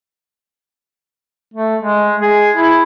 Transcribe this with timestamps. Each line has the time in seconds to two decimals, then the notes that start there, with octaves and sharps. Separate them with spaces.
1.54 A3
1.82 G#3
2.21 G#4
2.56 E4